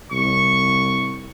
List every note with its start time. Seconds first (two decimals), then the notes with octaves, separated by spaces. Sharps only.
0.11 C2 C#6